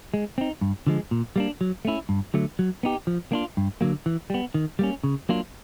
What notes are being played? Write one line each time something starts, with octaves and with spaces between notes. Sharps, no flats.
G#3
C4 D#4
G2
D3 F3 G#3
A#2
G3 A#3 D4
F#3
A3 C#4 E4
G2
D3 F#3 A3
F#3
B3 D#4 G4
F3
A#3 D4 F4
G2
D3 F#3 A#3
E3
G3 B3
D#3
G3 A#3 C#4
C#3
F#3 A#3 D4 F4